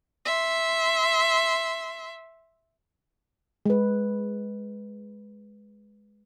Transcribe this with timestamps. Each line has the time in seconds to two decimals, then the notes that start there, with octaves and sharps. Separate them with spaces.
0.25 E5 C6
3.66 G#3 B4